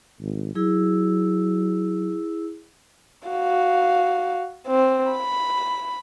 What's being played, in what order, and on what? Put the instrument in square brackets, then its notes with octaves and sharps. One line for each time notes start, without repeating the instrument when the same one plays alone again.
[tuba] G#1
[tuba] F#3 [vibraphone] E4 G#4 E6
[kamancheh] F#4 F5
C4
B5